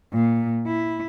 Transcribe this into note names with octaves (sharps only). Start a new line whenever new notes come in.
A#2
E4